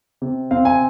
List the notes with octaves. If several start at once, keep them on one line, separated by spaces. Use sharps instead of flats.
C3
C4 F5
G#5